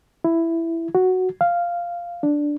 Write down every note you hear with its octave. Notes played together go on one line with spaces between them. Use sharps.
E4
F#4
F5
D4